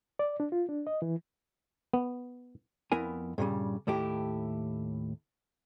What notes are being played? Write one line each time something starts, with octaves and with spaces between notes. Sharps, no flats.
D5
D4
F4
D4
D#5
E3
B3
F2 B3 E4 A#4 G#5
G2 A#2 C#3 G3
D#2 A2 A3 E4 G4